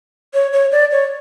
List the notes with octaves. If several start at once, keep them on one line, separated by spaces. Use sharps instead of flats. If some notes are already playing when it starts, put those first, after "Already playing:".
C#5
C#5
D5
C#5